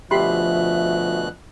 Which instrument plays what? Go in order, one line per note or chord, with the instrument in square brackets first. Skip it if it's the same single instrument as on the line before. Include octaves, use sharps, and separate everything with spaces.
[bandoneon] D2 B2 F#6 [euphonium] F3 [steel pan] G4 B5 C6 [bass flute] E5